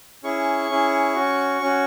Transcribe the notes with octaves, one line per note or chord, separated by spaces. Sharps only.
C#4 E4 G#4 C#6
C#4 E4 G#4
C#4 F#4
C#4 F#4